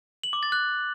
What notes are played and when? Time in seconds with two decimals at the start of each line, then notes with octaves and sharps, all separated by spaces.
0.23 F#7
0.33 D6
0.43 A6
0.52 F#6